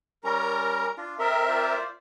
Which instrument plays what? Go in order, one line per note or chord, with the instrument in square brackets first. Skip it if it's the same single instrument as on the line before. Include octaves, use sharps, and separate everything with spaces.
[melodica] G3 C#4 [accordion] A#4 A#5
[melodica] D4 F4
[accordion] C4 A#4 E5 [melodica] A4 D#5 A#5
[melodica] F4 C5 D5